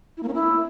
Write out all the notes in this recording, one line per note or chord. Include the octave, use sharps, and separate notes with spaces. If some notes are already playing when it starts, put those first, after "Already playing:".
E4
A#3
C#4
E4